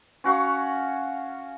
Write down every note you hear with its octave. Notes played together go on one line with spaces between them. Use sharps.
C#4 F#4 F5 C#6